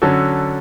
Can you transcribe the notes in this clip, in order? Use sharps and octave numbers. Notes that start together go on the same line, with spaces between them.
D3 F#3 C#4 F#4 A4